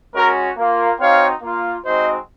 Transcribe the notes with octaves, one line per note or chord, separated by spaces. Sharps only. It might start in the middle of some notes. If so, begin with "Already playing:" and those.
G#3 C#4 F#4 A#4
A#3 F4
C4 D#4 F#4 C#5 F5
A#3 F4
G#3 C4 D#4 F#4 C5 D#5